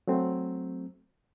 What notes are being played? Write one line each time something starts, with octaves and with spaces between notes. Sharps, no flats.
F#3 A3 C4